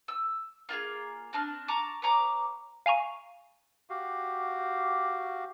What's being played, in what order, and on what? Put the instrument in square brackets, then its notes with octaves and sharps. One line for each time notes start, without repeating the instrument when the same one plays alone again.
[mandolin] E6
A#3 F4 G4 G#4
C4 D4 A5 F6
A5 A#5 C#6 D6
B3 C#5 A#5 D6
[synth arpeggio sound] F5 G#5 A#5 C#6 D#7
[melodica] F#4 G4 F5